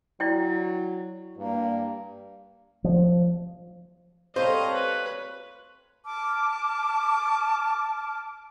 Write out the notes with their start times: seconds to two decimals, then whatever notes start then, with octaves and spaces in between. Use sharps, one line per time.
0.20 F#3 E4 D5 G5
1.38 G2 A#3
2.84 F3
4.36 G3 C4 A4 C5 C#5 D#5 F5 A#5
4.72 B4
6.05 A5 D6 F6